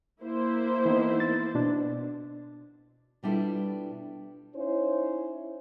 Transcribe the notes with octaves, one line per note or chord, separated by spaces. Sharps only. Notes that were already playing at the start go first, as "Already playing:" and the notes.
A#3 E4 C5
E3 B3 D#4
A6
B2 D4
B2 G3 D4 E4 F4 A4
C#4 D#4 E4 C5 C#5